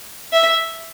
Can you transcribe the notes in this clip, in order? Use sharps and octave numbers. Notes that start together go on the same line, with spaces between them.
E5